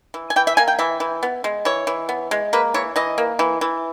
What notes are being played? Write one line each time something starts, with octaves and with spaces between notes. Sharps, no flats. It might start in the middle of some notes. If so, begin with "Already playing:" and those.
E3
G#5
E3 G5
E5
A#3 G#5
G5
E3 E5
E3
B3
G#3
E3 C#5
E3
B3
G#3
A#3 B4
E3 C#5
E3 D#5
A#3
E3
E3